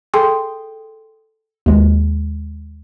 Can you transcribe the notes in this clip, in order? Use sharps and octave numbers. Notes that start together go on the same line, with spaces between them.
G#4 A4 G5 C6 D#6
D#2 G#3